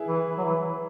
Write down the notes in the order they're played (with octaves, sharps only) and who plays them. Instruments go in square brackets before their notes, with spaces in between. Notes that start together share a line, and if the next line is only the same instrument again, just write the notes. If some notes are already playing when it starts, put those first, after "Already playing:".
Already playing: [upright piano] E4 G#4 B4
[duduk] E3
F#3
E3